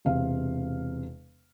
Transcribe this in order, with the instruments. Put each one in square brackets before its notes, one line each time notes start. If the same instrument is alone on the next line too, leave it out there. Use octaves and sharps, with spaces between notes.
[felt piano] E1 C3 F5